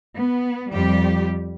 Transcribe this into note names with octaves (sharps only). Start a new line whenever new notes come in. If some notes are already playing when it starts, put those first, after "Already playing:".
B3
F2 G3 G4